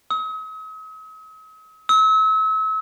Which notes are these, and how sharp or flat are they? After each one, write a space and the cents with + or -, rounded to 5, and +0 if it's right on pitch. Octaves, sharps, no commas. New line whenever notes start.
D#6 +45
E6 -35